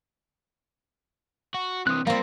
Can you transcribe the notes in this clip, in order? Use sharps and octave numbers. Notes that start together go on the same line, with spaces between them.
F#4
C3 E3 D#6 F#6
G3 A#3 C4 F4